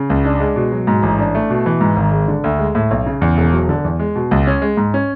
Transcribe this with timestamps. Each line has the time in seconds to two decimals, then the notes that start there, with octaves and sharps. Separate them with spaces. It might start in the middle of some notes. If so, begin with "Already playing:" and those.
Already playing: C#3
0.10 C#2
0.25 D4
0.40 G#3
0.56 B2
0.72 F#3
0.87 G#2
1.03 A1
1.19 D4
1.35 A3
1.50 B2
1.66 E3
1.81 G#2
1.96 G#1
2.12 G#3
2.28 D3
2.44 D2
2.59 G#3
2.75 A2
2.91 B1
3.06 C#3
3.21 E2
3.37 E1
3.52 F#3
3.69 D3
3.84 E2
3.99 G#3
4.16 B2
4.31 C#2
4.47 C#4
4.62 G#3
4.77 G#2
4.94 C#4